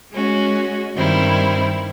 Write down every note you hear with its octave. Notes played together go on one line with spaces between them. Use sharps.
G#3 C#4 F#4
G2 D#3 G3 C4 E4